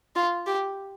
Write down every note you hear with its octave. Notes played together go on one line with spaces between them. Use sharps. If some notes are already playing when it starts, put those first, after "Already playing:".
F4
G4